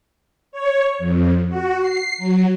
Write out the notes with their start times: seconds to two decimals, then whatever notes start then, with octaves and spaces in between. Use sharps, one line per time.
0.52 C#5
0.99 F2
1.49 F#4
1.79 C7
2.18 F#3